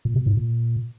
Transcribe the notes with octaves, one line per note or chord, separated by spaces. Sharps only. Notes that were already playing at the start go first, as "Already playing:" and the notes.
A#2
B2
G#2
A#2